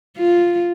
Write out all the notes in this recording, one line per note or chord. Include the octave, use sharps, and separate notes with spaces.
F4